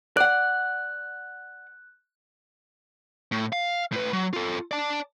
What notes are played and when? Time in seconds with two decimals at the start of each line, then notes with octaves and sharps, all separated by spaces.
0.17 D5 F#5 F#6
3.32 A2
3.53 F5
3.92 A2 B4
4.13 F#3
4.33 F4 A4
4.71 D5 A5